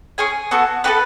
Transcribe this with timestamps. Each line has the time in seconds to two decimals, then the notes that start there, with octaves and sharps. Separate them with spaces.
0.18 C#4 G#4 G#5
0.51 B3 F#4 A4
0.84 B3 F#4 A4 B4